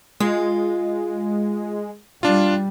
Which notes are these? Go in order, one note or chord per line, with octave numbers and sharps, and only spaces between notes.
G#3 F4
G3 D4 F4